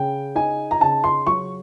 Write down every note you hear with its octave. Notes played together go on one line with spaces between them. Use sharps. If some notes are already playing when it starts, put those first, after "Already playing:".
Already playing: C#3 G5
D#4 G#5
A#5
C#3 A5
C6
F#3 C#6